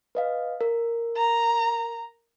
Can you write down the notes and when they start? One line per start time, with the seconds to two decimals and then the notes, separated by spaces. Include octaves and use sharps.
0.15 B4 D#5 F5
0.61 A#4
1.17 A#5